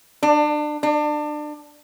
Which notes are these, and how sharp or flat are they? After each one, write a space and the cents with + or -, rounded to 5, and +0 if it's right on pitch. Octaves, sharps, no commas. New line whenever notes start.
D4 +30
D4 +30